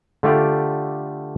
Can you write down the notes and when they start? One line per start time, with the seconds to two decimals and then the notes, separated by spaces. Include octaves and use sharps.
0.23 D3 A3 F4 G4 D5